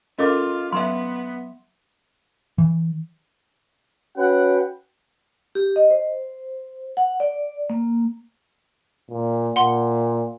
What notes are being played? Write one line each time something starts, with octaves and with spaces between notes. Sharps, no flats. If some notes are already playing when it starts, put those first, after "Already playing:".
C#4 F4 A4 A#4 D#5 D6
F#3 B3 E5 C6
E3
C#4 F#4 B4 F#5 G5
G4
D#5
C5
F#5
D5
A#3
A#2
A#2 F#5 C6